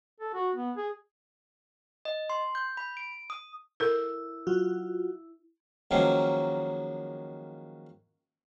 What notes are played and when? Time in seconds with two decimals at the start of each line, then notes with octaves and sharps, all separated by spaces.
0.20 A4
0.34 F#4
0.55 B3
0.77 G#4
2.05 D#5
2.30 C6
2.55 G6
2.77 B5
2.97 D7
3.30 D#6
3.80 E4 A4 A#4
4.47 F#3 F4 F#4
5.91 D#3 F3 F#3 G#3 A#3 C#4